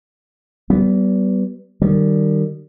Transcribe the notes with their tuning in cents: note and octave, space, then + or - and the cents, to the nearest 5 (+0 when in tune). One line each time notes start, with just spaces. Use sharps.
G3 -30 B3 +0
D#3 -30 G3 -25